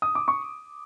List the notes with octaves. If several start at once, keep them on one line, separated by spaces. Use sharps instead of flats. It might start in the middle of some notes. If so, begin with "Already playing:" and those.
D#6
D6
C#6